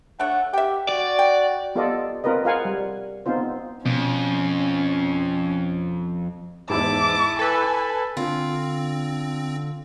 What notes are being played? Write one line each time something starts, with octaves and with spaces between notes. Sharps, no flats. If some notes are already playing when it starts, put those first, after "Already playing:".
A3 D4 C#5 F#5
G4 E5 G5
F#4 D5
G5
B3 F4 G4 A4 D5 D#5
C4 F4 A#4 B4 D#5
F4 G#4 A#4 F5 F#5 G#5
G3
B3 C4 D#4 F4 C5
F2 B2 C#4
E2 G#2 E4 A5 D6
A4 B4 G#5
D3 C4 F4